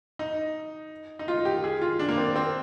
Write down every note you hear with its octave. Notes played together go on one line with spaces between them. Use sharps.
D#4
D#4
F4
G4
G#4
F4
D4
A#3
C4
C4